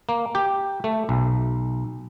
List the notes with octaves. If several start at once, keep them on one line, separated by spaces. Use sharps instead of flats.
A#3
G4
A3
B1